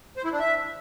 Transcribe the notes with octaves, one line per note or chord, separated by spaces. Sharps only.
C5
E4
D4
E5